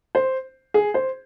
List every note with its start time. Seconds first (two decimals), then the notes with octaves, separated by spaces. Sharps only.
0.15 C5
0.74 G#4
0.94 C5